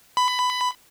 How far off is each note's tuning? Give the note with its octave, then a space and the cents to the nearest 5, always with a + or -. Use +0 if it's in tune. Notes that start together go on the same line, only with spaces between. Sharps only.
B5 +15